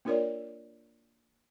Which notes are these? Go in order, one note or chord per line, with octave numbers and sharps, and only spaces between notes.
A#3 D4 F4 A#4 C#5 D5